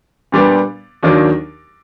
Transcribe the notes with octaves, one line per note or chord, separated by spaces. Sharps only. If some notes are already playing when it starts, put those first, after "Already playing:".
A#2 G3 B3 D4
D#2 D#3 F#3 A#3 D4